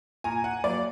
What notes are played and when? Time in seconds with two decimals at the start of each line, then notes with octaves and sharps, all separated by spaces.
0.24 A#2 G#5 A#5
0.44 F#5 G#5
0.64 F#3 A#3 D5